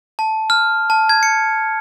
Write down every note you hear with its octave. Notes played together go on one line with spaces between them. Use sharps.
A5
F6
A5
G#6
C#7